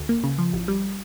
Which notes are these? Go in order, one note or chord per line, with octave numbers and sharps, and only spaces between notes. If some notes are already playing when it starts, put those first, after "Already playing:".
Already playing: D2
A#3
C#3
F3
A1
G3